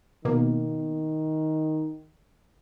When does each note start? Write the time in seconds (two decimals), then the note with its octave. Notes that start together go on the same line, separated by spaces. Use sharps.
0.25 B2 D#3 A#3